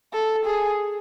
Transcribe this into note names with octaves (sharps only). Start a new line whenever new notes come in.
A4
G#4